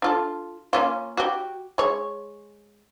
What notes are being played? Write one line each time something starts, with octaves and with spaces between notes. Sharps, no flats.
D4 F4 A4
A#3 C#4 F4
F#4 G4
G#3 C#5